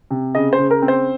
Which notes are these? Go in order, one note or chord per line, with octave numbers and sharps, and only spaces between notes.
C3
C#3 D#5
C5
C#3
A#4
C4
C5